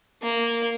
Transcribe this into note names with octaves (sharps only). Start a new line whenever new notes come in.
A#3